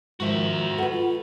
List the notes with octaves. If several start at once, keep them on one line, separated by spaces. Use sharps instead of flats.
G#2 D#3 F3 F#4 E5
A4 B4 F#5
F4